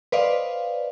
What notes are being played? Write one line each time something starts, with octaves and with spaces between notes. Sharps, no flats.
B4 C5 D5 D#5 F5